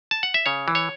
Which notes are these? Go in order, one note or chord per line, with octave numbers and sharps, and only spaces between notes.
A5
F#5
E5
C#3 C#5
E3
C#5